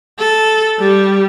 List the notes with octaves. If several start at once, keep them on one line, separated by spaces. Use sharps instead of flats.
A4
G3